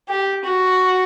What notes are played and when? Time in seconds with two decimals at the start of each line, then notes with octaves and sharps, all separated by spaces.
0.08 G4
0.44 F#4